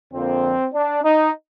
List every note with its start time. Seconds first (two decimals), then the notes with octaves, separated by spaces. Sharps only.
0.12 F2 D3 F3 A#3 C4
0.73 D4
1.03 D#4